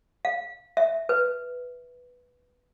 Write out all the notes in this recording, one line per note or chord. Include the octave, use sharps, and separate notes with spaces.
F5
E5
B4